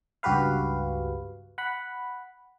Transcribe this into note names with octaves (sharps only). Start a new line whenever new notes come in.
C#2 G2 F#4 G4 B4 F5
F#5 B5